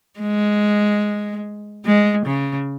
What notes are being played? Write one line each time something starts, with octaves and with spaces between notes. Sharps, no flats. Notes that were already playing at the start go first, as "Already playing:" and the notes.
G#3
G#3
C#3